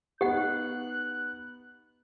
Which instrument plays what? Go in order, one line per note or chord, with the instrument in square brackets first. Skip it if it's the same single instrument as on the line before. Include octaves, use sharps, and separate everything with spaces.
[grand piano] B3 D#4 [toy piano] G4 F#5 [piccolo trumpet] F#6